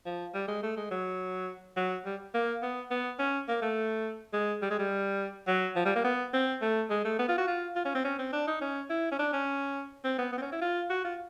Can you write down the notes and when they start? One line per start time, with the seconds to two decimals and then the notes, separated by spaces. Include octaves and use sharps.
0.06 F3
0.34 G3
0.48 G#3
0.63 A3
0.77 G#3
0.91 F#3
1.77 F#3
2.05 G3
2.34 A#3
2.62 B3
2.90 B3
3.19 C#4
3.48 A#3
3.62 A3
4.33 G#3
4.62 G3
4.70 G#3
4.79 G3
5.47 F#3
5.76 F3
5.85 G3
5.95 A#3
6.04 B3
6.33 C4
6.62 A3
6.90 G#3
7.05 A3
7.19 B3
7.28 F4
7.38 F#4
7.47 F4
7.76 F4
7.85 C#4
7.95 C4
8.04 C#4
8.19 C4
8.32 D4
8.47 D#4
8.61 C#4
8.90 E4
9.12 C#4
9.19 D4
9.33 C#4
10.04 C4
10.18 B3
10.33 B3
10.38 C4
10.42 C#4
10.52 E4
10.61 F4
10.90 F#4
11.04 F4